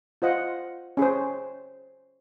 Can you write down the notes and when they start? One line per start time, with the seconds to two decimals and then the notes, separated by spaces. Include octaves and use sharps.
0.22 F4 C5 D#5 F#5
0.97 C#4 G#4 C5